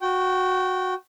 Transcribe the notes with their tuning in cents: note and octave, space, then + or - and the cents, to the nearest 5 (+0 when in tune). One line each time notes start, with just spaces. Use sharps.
F#4 -10 G5 -25